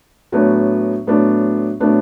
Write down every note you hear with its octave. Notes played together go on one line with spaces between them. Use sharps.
A2 F#3 B3 D4
A2 F#3 B3 D4
A2 F#3 B3 D4